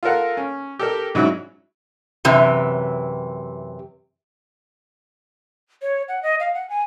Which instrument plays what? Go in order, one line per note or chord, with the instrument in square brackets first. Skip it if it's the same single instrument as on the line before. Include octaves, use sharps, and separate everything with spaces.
[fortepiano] F4 A4 A#4 F#5
C#4
G4 A4 A#4
G#2 C#3 F#3 D4 E4 F#4
[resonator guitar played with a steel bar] F#2 C3 E3
[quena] C#5
F#5
D#5
F5
F#5
G#5